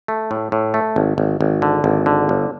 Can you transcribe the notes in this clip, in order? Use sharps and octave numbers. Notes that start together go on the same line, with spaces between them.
A3
A2
A2
A3
G#1
G#1
G#1
D3
G#1
D3
G1